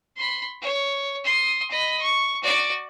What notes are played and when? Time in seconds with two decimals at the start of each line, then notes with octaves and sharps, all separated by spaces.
0.17 B5 C6
0.62 C#5
1.24 C6 D#6
1.71 D#5 B5
2.02 C#6
2.43 F#4 D5